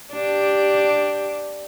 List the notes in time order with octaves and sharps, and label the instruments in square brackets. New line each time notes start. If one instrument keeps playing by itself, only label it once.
[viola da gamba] D4 G4